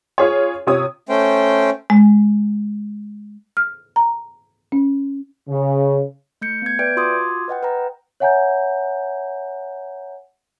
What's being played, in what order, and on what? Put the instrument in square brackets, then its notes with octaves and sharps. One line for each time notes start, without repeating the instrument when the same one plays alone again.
[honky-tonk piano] F4 G#4 C#5
C3 F4 C#5 D#6
[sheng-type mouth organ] A3 C#4 C5 G5
[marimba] G#3
F6
A#5
C#4
[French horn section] C#3
[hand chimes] A3 G6 C#7
B3 G#6
B4 D5 E5 G5 G6 D7
F4 F#4 C6 D6 D#6 G#6
B4 D#5 F#5 G5
B4 G5 A#5
[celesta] C#5 E5 F#5 G#5 A#5 G6